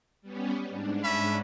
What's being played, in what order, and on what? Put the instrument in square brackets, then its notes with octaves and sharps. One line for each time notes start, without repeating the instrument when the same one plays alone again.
[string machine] G3 B3 C#4
G#2 D4
[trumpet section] C#4 E5 B5